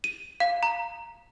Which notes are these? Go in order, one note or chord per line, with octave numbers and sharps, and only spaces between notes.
D#7
F5
A#5